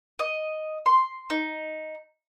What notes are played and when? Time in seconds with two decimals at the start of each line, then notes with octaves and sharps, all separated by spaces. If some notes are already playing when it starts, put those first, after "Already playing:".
0.19 D#5
0.86 C6
1.30 D#4